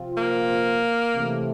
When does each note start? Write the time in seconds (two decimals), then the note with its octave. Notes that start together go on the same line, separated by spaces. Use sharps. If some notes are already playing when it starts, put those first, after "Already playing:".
Already playing: C3 F3 C4 F4
0.17 A#3
1.15 C3 E3 A3